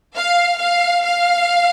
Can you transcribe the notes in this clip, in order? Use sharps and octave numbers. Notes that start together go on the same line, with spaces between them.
F5
F5
F5